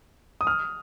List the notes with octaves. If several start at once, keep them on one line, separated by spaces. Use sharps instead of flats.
D#6
F6